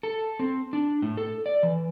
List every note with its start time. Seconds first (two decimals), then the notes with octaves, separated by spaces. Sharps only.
0.03 A4
0.39 C4
0.73 D4
1.02 A2
1.17 A4
1.46 D5
1.63 E3